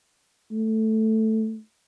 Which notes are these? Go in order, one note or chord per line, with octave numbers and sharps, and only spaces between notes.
A3